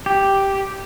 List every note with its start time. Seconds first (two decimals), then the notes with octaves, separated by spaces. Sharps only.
0.06 G4